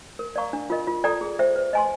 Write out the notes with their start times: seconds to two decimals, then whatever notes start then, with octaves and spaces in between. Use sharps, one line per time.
0.19 A#4
0.36 D5 F5 A#5 C#6
0.53 D4
0.70 F4 A#4 D#5
0.87 F4
1.04 A4 D5 G5 A#5
1.21 G#4
1.39 C5 E5 G5
1.56 B4
1.73 D#5 G#5 C6